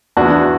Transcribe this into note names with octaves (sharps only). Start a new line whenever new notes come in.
E2 D4 F#4